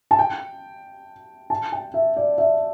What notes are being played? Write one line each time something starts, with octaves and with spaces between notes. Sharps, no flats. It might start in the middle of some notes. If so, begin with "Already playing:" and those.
A5
G5
A5
G5
E5
D5
E5